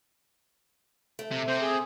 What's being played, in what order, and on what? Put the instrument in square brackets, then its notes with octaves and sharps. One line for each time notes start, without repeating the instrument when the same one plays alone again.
[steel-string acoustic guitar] A3
[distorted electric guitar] C3
[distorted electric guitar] C3 [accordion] C5
[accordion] G#4